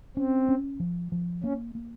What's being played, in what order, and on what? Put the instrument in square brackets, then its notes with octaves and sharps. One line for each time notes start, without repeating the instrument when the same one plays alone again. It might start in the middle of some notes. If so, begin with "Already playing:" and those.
[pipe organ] C4 [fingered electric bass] C#4
[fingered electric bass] C#4
F3
F3
[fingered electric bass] A#3 [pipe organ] C#4
[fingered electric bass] A#3